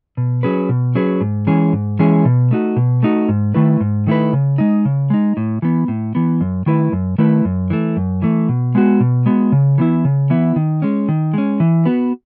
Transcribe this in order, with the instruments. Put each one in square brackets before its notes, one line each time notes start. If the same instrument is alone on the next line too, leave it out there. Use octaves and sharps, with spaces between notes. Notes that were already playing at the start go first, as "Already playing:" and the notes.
[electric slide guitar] B2
F#3 C#4 G#4 B4
B2
F#3 C#4 G#4 B4
G#2
E3 G#3 C#4 G#4
G#2
E3 G#3 C#4 G#4
B2
A3 D#4 F#4
B2
A3 D#4 F#4
G#2
D#3 A3 E4 B4
G#2
D#3 A3 E4 B4
C#3
G#3 D#4
C#3
G#3 D#4
A2
E3 B3
A2
E3 B3
F#2
D#3 A3 E4 B4
F#2
D#3 A3 E4 B4
F#2
E3 A3
F#2
E3 A3
B2
G#3 B3 F#4
B2
G#3 B3 F#4
C#3
E3 B3 E4
C#3
E3 B3 E4
D#3
G#3 C#4
D#3
G#3 C#4
E3
B3 F#4 B4